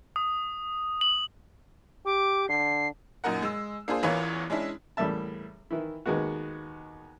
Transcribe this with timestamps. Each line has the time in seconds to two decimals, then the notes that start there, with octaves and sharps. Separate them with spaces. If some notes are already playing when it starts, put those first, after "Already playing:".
0.16 D#6
1.01 F#7
2.06 G4 D6
2.49 D3 C7
3.24 F#2 A#2 D#4 A#4 F#5
3.42 G#3 E6
3.88 A#3 D4 F4 G#4 C5
4.03 A1 E2 E3 F4 A#4 C#5
4.50 G#3 C#4 D4 E4
4.97 E2 A2 G3 A#3 E5 A5
5.71 D#3 E3 E4
6.06 D#2 D#3 G#3 B3 F#4